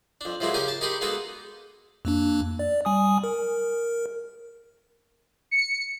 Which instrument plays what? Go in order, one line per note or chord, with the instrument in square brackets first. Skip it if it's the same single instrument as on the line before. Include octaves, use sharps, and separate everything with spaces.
[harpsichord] F2 D4
A2 F3 G#3 A#3 E4 F#4
C#3 C#4 G4 A#4 G#5
A5
D#4 G4 G#4 A#4 B5 C6
G#3 A#3 B3 D#4 F#4 A4
[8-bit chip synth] F2 A#3 D4
D5
G3 G#5 D#6
A#4
[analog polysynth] C#7